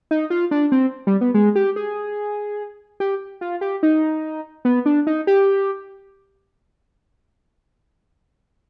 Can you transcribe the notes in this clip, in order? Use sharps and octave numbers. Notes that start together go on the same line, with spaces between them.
D#4
F4
D4
C4
G3
B3
G#3
G4
G#4
G4
F4
G4
D#4
B3
D4
D#4
G4